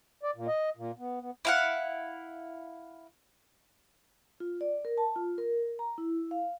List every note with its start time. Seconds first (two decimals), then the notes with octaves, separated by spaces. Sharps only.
0.23 D5
0.36 A#2
0.47 D#5
0.77 A#2
0.99 B3
1.21 B3
1.45 E4 F5 F#5
4.40 F4
4.61 D5
4.85 A#4
4.98 A5
5.16 F4
5.38 A#4
5.79 A#5
5.98 E4
6.31 F5